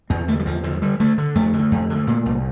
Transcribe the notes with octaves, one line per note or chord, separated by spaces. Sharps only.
E2 C4
D3 A3
G3
E2 F3
D3 F3
D3 G3
D3 A3
D3
F2 A3
D3
F2
D3
A#2
C2